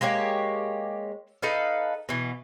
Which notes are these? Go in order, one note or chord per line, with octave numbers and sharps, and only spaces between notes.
G#3 A#3 G4 C#5
D#4 A4 B4 F5
B2 E3